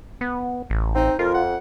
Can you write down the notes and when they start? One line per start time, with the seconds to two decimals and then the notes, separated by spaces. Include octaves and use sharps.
0.21 B3
0.70 A1
0.95 C4 D#4
1.19 F2 F4 A#4
1.34 F#5